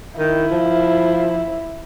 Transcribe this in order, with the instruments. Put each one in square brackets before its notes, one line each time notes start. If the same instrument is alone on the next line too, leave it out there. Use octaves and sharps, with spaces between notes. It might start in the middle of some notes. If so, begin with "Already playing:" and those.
[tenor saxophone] D#3 [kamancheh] E4
[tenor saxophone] F3